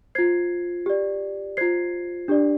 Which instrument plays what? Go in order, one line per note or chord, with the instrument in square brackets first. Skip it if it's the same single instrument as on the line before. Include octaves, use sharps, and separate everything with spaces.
[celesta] F4 C5 G#6 C7
G4 D5
F4 C5 G#6 C7
D4 G4 D5